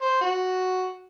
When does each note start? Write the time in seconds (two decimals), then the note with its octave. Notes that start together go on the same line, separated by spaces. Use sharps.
0.02 C5
0.21 F#4